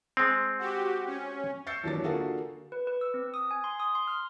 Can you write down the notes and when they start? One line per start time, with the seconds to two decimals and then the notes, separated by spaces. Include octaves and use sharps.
0.17 G#3 C4
0.59 F#4 G4
1.07 C#4
1.67 C#6 E6 G6 A6 C7 C#7
1.84 D#2 E3 F#3 D4 A6
2.04 D3 A#3 F4 F#4 G#4 A4
2.72 B4
2.87 B4
3.01 E6
3.14 C4
3.34 D#6
3.51 G#5
3.64 C6
3.80 D#6
3.95 C6
4.07 F6